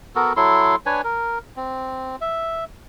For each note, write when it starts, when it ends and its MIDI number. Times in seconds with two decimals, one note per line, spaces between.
0.15 0.33 59
0.15 0.33 66
0.15 0.33 69
0.15 0.33 70
0.37 0.76 54
0.37 0.76 64
0.37 0.76 69
0.37 0.76 84
0.86 1.01 62
0.86 1.01 71
0.86 1.01 73
0.86 1.01 80
1.04 1.38 70
1.56 2.16 60
2.21 2.64 76